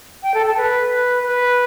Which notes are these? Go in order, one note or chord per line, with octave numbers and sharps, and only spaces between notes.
G5
A4
A4
B4
B4